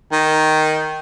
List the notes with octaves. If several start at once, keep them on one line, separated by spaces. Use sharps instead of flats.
D#3